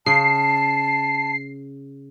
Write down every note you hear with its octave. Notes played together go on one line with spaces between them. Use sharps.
C#3 A5 C7